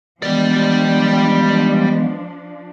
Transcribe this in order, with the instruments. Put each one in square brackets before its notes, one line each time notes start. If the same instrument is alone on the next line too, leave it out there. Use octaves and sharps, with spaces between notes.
[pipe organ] E3 G#3 B3 [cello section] F3 D4 [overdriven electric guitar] G3 D5